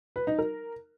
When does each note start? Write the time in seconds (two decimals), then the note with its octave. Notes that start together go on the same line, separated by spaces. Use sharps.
0.16 B4
0.27 D#4
0.39 A#4